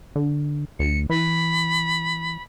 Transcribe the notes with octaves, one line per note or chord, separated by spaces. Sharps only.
D3
D2 C#7
E3 B5